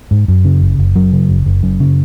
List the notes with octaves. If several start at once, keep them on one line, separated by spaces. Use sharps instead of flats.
G#2
F#2
C#3
F#1
F#1
F#2 F#3
C#3
F#1
F#1
F#2
C#3